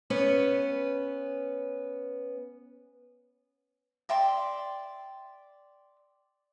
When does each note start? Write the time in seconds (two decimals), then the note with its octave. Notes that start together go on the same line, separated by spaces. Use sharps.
0.10 B3 C#4 B4
4.09 D5 E5 G5 C6